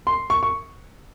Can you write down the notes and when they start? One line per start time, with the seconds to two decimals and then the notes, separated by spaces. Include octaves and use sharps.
0.07 C6
0.30 C#6
0.43 C#6